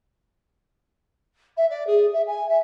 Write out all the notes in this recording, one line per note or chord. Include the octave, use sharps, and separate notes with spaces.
E5
D5
G#4
E5
G#5
E5